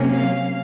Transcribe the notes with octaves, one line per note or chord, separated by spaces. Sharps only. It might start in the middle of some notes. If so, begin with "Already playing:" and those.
Already playing: C3 F#3 A#3 C#4
F5